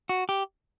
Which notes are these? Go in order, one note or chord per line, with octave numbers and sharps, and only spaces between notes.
F#4
G4